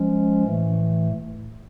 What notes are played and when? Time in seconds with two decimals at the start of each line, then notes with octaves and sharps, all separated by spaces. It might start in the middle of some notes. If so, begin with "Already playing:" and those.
Already playing: F3 G#3 C#4
0.43 A2 E3 A3